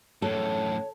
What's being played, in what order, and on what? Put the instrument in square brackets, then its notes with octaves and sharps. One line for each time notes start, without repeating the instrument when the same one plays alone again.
[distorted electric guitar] F#2 A2 [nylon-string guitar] A4 [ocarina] C#5